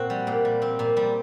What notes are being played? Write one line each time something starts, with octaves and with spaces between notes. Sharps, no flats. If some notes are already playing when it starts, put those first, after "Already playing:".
Already playing: A#2 C4 F#4
G3
A#2
G3
C4
A#2
G3